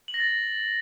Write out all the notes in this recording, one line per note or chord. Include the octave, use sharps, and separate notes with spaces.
F#7
A#6
A6